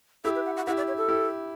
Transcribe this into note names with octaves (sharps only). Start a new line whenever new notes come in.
E4 G4 A4
B4
F#5
F#5
E4 G4 F#5
D5
C#5
A4
E4 G4